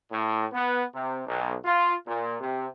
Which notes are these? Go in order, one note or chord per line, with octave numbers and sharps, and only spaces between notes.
A2
B3
C3
B1
F4
A#2
C3